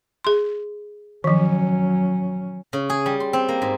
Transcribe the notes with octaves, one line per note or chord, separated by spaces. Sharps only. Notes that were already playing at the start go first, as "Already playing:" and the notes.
G#4 C6
D#3 F3 F#3 C#4
C#3
G#4
G3
C6
C4
A#3
G#2